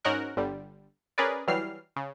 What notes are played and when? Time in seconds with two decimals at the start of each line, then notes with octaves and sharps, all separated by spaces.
0.05 G#2 C#4 D#4 F#4 A#4 F#6
0.36 G1 D3 G3
1.18 C#4 G#4 A#4 B4 D5
1.48 E3 F#3 G3 F6 C7
1.96 C#3